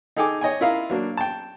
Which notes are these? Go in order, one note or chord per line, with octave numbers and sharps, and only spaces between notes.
D#4 G#4 A4 G5 G#5 D6
C#5 D#5 G5 G#5
E4 F4 A#4 D#5 F5
F#3 A#3 D4
G5 A5